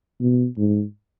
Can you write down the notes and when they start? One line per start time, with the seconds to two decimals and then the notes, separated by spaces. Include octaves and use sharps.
0.20 B2
0.57 G#2